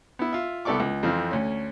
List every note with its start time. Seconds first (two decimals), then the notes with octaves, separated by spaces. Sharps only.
0.19 B3 E4
0.33 F4 E5
0.65 C2 B3 A4 D5 C#6 D6
0.80 C#2
1.03 F2 E3 C4 F5
1.31 D2 C#4